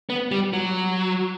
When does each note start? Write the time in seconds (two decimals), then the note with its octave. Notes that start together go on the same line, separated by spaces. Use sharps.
0.10 B3
0.32 G3
0.53 F#3